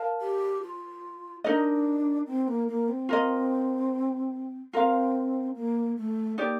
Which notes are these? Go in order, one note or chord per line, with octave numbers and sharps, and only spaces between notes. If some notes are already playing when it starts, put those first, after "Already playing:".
Already playing: A#4 F5 A5
G4
F4
D4 D#4 A#4 D#5
C4
A#3
A#3
C4
F4 A#4 D#5
C4 F4 A#4 F5
A#3
A3
A#3 D#4 G4 D5